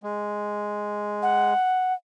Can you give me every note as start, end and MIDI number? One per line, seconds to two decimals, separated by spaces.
0.03 1.54 56
1.22 1.94 78